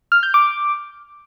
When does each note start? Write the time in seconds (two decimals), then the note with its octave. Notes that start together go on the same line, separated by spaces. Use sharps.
0.12 F6
0.23 G6
0.34 D6